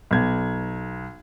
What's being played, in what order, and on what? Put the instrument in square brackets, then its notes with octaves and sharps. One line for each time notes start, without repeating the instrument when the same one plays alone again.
[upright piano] B1 G#6